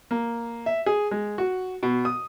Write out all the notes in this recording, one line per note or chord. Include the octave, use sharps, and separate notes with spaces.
A#3
E5
G#4
G#3
F#4
B2
D#6